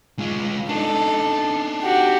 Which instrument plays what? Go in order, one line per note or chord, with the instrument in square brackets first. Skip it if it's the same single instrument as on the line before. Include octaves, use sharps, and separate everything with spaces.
[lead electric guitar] G#3 F4
[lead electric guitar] D4 D#4 [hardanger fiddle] A4
[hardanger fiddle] F#4 G4